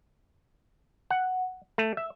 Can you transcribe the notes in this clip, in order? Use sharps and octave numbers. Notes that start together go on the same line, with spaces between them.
F#5
A3
E5